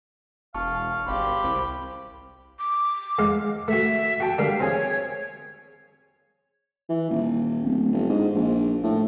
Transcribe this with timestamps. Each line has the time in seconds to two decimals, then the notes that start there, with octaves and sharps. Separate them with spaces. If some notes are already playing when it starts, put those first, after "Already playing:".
0.54 E1 F5 A5 C#6 F6
1.07 G#1 G4 F5 B5 C6
1.44 C2 C5
2.59 D6
3.19 E2 G#3 F5
3.68 A3 F#4 E5
4.20 F#4 G5 A5
4.38 D3 G3 A#3 F5
4.60 C4 G#4 C#5
6.90 E3
7.10 D#1
7.64 D1
7.93 G1
8.09 G#2
8.35 A#1
8.83 A2